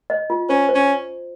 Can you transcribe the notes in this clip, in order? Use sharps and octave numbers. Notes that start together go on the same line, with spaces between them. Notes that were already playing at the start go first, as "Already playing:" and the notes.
D#5
F4
C#4 C5
C5
C#4